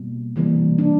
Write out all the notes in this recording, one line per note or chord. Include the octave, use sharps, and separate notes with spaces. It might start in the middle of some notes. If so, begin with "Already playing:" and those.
Already playing: B2 G3 A#3
C3 E3 G3 A#3
D4